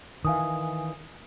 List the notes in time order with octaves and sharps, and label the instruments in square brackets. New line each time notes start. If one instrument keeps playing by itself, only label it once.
[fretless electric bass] D#3 E3 [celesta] F5 G#5 D#6